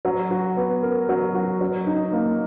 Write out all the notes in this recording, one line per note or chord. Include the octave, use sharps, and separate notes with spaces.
F#3
F#4
B3
A#4
F#3
F#4
F#3
D#4
A#3